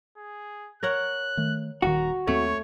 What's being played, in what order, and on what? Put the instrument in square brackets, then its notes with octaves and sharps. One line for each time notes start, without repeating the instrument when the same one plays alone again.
[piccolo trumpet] G#4
[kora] A#4 C#5 F#5 [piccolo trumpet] F#6
[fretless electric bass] D#3 A3
[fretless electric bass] D#1 D#3 [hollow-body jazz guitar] F#4 [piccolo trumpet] A#5
[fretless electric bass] D#2 C4 [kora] A3 [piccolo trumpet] C#5